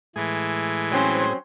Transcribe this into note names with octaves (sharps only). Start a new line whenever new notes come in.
A2 E3 G#3 G#4
F#3 C4 C#4 C5